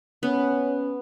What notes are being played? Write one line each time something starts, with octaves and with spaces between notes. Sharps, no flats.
B3 C#4